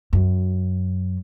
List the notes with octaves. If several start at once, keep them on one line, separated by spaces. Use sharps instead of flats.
F#2